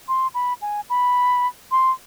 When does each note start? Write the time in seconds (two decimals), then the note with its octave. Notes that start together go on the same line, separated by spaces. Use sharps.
0.08 C6
0.34 B5
0.62 G#5
0.90 B5
1.72 C6